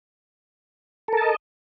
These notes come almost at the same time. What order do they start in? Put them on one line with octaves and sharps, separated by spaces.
A4 A#4 A5 D#5